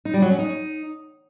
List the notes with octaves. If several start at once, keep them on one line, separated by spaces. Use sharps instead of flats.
D#4
G3
F#3
C#4
D#4